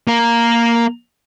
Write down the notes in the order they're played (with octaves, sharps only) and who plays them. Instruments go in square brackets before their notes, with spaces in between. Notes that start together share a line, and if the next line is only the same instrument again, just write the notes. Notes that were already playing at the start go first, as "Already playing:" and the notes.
[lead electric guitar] A#3 A#4